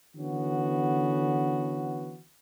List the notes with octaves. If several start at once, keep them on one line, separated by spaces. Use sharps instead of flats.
D3 E3 B3 C#4 F#4